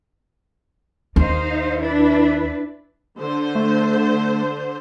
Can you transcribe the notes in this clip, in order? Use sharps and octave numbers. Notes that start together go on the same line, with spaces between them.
D#2 D#4 C5 F5
D4 E4 B4
D3 C5
A3